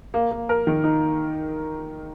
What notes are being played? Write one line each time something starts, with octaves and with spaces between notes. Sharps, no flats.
A#3
A#3
A#4
D#3
D#4